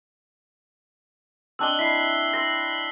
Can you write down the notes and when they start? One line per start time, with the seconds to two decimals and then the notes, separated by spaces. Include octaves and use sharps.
1.59 C4 D4 D#5 E6 F#6 G7
1.79 E4 B6 C7
2.34 C5 E6 A#6